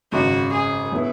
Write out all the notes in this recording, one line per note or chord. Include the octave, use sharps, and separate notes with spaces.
G#1 F#2 C#3 F#4
G#4
F#3 B3 E4